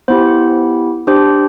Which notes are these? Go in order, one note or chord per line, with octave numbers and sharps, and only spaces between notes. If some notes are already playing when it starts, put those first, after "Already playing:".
B3 E4 G4 C5
D4 G4 C5